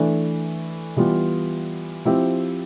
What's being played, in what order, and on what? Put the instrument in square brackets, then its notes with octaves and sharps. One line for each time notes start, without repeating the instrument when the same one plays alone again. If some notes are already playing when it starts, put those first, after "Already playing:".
Already playing: [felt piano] E3 A3 D4
E3 G3 B3 F4
F3 C4 E4 G4